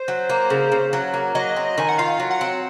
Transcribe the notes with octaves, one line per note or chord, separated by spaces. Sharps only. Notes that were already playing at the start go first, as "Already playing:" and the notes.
Already playing: C5
F#3
A#3
C#3
C#3
F#3
A#3
F#3 D#5
C4
D#3 G#5
F#5
F4 F5
F#3
F#5
C4